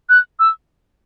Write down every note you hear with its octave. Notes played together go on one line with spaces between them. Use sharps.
F#6
E6